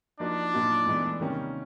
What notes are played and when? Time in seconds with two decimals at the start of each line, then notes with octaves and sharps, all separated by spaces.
0.19 F3 A#3 D4 D#4 F#4
0.54 A#2 F#3 A#3 D#4 F#4
0.86 A2 E3 G#3 B3
1.20 C3 D#3 G3 A#3 C#4